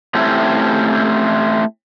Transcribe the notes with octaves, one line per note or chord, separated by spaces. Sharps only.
A3 C4 C#4 E4 G4